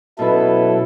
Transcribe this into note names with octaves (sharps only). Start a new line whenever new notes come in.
B2 F#3 C#4 E4 A4 B4